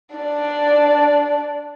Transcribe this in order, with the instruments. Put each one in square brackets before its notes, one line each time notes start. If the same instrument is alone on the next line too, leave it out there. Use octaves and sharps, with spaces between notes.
[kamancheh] D4 D5